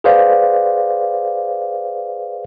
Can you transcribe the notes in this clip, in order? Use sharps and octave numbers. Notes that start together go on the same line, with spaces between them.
G#4 B4 C5 D5 F5 F#5